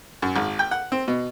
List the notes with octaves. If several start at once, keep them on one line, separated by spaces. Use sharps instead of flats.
F#2
G#1
G5
F#5
C4
B2